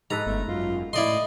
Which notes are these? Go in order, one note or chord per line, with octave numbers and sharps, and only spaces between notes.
G#2 A4 B4 A#5
G1 A3
F#2 F4
A2 E4 D5 D#5 C6